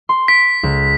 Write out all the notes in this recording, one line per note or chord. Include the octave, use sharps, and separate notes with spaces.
C6
B6 D7
C#2